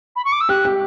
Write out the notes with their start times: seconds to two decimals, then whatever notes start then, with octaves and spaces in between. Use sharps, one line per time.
0.16 B5
0.25 C#6
0.32 D6
0.41 E6
0.49 G4 F#6
0.65 G4